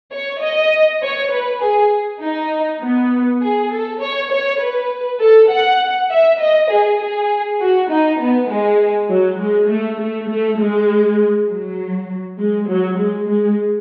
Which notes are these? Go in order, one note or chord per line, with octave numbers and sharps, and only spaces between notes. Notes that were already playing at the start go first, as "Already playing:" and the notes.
C#5
D#5
C#5
B4
G#4
D#4
B3
G#4
A4
C#5
C#5
B4
A4
F#5
E5
D#5
G#4
G#4
F#4
D#4
B3
G#3
F#3
G#3
A3
A3
A3
G#3
F#3
G#3
F#3
G#3
G#3